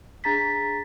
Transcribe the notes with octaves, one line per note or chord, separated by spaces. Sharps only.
D4 G#4 A#5 A6 B6